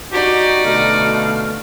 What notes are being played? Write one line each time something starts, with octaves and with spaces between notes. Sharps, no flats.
D#4 F#4 G4 D5
B2 D3 A3 F5